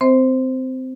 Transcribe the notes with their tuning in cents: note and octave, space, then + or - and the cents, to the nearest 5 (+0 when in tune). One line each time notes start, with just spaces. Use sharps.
C4 -20 C5 +0 E5 -35